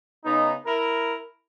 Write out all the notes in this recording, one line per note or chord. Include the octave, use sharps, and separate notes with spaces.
C#3 B3 D#4
E4 A#4